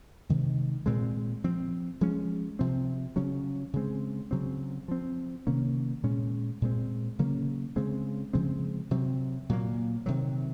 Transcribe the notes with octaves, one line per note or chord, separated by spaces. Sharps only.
C3 D#3 G#3
A#2 G#3 C4
F3 C4
F3 G#3 C#4
C3 F3 C4
C#3 F#3 C#4
C#3 G#3 C4
C#3 F#3 C4
F3 C4
C3 D#3 A#3 C#4
A#2 G#3 C#4
A#2 G#3 C4
C#3 F#3 A#3 C#4
C#3 G#3 C4
C#3 F3 G#3 C4
C3 F#3 C4
A#2 F#3 A#3
C3 D#3 F#3